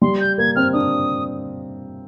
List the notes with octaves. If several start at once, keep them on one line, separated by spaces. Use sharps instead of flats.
G3 C6
G6
A#3 G#6
C4 F6
D4 D#6